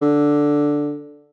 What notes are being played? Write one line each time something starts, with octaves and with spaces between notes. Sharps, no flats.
D3